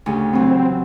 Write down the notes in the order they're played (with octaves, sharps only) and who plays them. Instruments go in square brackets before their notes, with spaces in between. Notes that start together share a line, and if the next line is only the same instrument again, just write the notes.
[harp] D2 G2 C#3
[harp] E3 F#3 [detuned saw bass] C4